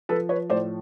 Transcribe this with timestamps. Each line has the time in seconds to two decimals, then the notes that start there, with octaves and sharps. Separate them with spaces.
0.09 F3 A4 B4
0.29 B4 C#5
0.50 A2 C5 D5